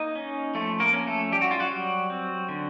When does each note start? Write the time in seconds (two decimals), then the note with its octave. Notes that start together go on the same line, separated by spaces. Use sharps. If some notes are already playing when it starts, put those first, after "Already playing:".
Already playing: A#3 D#4 D#5
0.15 C#4
0.55 F3 A3 A4
0.80 A#3 A#4
0.94 C#4
1.07 A3 A4
1.32 G3 G4
1.42 F#4
1.51 F4
1.60 F#3 F#4
1.71 G3
2.10 C4
2.49 D3